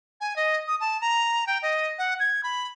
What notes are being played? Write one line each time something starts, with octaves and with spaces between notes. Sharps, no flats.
G#5
D#5
D#6
A5
A#5
G5
D#5
F#5
G#6
B5